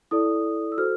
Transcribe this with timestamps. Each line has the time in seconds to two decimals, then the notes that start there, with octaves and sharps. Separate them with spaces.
0.11 E4 A4 D5 D#6
0.72 E6
0.78 F#4 A4 C5 F6